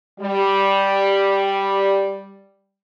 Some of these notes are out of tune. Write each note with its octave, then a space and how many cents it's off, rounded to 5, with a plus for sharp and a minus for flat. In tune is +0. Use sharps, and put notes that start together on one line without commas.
G3 +0